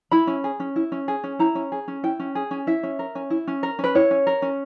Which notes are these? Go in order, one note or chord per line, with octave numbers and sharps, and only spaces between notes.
E4 B5
C#4
G#4
C#4
E4
C#4
G#4
C#4
E4 A#5
C#4
G#4
C#4
E4 G5
C#4
G#4
C#4
E4 E5
C#4
A#4
C#4
E4
C#4
A#4
C#4 B4
E4 C#5
C#4
A#4
C#4